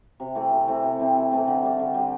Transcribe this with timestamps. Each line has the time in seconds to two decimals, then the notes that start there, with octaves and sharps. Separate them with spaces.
0.20 C3
0.35 E3 A3 C4
0.51 C3
0.67 E3 A3 C4
0.84 C3
0.99 E3 A3 C4
1.15 C3
1.31 E3 A3 C4
1.48 D3
1.63 G3 D4
1.79 D3
1.94 G3 D4